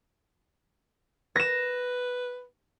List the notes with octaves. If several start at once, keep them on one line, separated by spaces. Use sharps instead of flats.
B4 A#6 E7